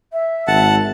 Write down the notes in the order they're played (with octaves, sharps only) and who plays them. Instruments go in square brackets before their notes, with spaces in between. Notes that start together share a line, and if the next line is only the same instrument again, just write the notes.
[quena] E5
[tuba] G#1 [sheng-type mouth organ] F#5 A5